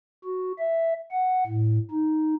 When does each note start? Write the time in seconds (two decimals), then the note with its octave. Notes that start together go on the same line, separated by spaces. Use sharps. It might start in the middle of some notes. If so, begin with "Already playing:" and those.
0.24 F#4
0.59 E5
1.11 F#5
1.47 A2
1.91 D#4